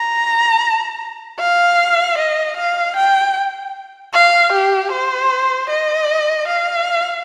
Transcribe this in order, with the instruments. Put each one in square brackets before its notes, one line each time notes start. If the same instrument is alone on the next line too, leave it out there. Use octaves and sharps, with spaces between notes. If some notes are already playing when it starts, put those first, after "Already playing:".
Already playing: [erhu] A#5
F5
D#5
F5
G5
F5
G4
C5
D#5
F5